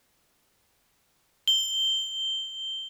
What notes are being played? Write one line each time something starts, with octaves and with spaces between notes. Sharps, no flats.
G7